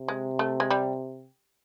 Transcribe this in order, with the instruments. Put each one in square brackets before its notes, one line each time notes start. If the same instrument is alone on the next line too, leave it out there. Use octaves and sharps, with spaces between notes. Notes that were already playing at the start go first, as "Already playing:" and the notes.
Already playing: [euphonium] C3
[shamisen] G#3
A3
G#3
G3